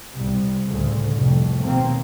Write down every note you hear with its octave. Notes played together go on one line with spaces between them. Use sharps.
C2
D2 A2 C#3
F1 C2 F2
D#2 B2 A#3 C4